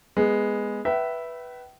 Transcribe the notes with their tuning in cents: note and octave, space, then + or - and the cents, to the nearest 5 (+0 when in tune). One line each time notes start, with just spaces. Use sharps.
G#3 +0 B3 +0
B4 -5 E5 +0 G5 -40